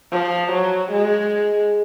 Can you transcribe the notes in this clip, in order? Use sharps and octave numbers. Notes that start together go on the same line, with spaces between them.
F3
F#3
G#3